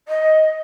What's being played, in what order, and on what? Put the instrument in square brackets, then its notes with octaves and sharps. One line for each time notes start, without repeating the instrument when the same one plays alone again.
[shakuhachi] D#5